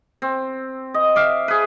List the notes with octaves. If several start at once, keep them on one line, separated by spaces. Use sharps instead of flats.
C4
D#5
E5 F5 D6
G#4 B4